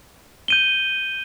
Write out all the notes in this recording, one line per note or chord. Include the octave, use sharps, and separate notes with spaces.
G6 D#7 G7